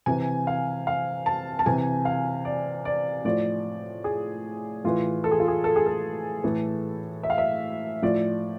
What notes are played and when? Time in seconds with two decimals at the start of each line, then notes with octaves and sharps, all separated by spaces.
0.06 C3 E3 G#5
0.47 F5
0.87 F5
1.26 A5
1.59 A5
1.66 C3 E3 G#5
2.05 F5
2.45 D5
2.85 D5
3.25 A2 F3 D5
4.04 G#4
4.84 A2 E3 F4
5.24 A4
5.31 G#4
5.40 F4
5.48 G#4
5.64 A4
5.76 G#4
5.86 A4
6.44 A2 E3
7.23 E5
7.30 F5
7.38 E5
8.02 A2 F3 D5